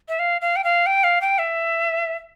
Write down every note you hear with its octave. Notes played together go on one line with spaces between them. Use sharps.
E5
F5
F5
G5
F5
G5
F5
G5
E5